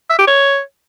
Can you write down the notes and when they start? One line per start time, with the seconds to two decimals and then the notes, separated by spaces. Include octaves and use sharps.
0.10 E5
0.19 G4
0.27 C#5